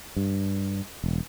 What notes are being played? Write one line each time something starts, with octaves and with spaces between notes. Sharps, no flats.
G2
E1